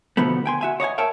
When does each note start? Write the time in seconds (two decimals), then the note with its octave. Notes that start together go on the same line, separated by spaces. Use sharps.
0.17 B2 D3 D#3 F3 A3 B3
0.46 G5 G#5 C6
0.61 F#4 E5 G#5
0.80 C#5 D#5 F5 G#5
0.98 A#4 C#5 E5 G5 A5